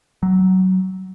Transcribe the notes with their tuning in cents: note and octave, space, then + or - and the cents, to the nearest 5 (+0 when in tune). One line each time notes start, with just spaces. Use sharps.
F#3 +15